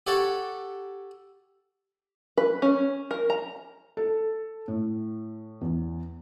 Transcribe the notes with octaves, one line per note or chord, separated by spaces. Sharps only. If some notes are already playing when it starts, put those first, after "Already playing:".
G4 A4 C#5 F#5 A5
B4
C#4
A#4
A#5
A4
A2
E2